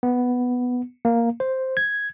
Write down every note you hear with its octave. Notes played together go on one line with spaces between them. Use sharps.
B3
A#3
C5
G#6